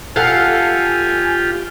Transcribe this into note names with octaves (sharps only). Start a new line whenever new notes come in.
F4 G4 A4 F5 F#5 G#5